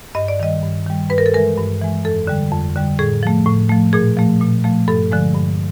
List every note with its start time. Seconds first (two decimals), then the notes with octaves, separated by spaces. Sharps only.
0.15 G2 D#5
0.28 D5
0.40 D#3 G3 D#5
0.63 G2
0.87 D#3 G3
1.10 G2 B4
1.18 A#4
1.26 A4
1.34 E3 G#3 A#4
1.57 G2
1.81 E3 G#3
2.05 F2 A4
2.27 D3 G3
2.52 F2
2.75 D3 G3
2.99 A2 G#4
3.23 F3 A3
3.46 A2
3.69 F3 A3
3.93 A#2 G#4
4.17 F3 A3
4.41 A#2
4.64 F3 A3
4.88 G2 A4
5.12 D3 F3 G#3
5.35 G2